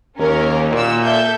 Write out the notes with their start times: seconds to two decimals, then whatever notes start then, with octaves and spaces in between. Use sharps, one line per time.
0.19 D#2 C#4 A#4
0.72 A#2 F#4 E6
1.03 A4 E5 G6